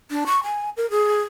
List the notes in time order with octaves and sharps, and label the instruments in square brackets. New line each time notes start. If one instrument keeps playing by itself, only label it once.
[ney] D4
C#6
G#5
A#4
G#4